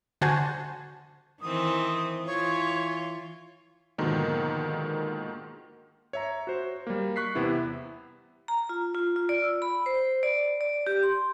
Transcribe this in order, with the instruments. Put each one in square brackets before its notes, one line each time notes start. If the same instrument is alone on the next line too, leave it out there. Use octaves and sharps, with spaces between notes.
[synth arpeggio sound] D3 F#4 C5 G#5 A5 G#6
[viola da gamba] D#3 E3 C4 [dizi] D#6
[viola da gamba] E3 F4 [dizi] C#5
[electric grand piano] G#2 B2 D3 D#3 F3 A#3
C#5 E5 A#5
F#4 C5
G3 A#3
C#6 F#6 B6 C7
E2 C3 B3 E4
[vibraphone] A#5
F4
F4
F4
D5
E6
B5
C5
D5
D5
G4
C6